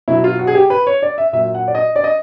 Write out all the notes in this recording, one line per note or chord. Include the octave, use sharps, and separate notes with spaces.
B2 F#3 E4
F4
F#4
G#4
G4
B4
C#5
D5
E5
A#2 F#3 E5
F#5
D5
D#5
D5
D#5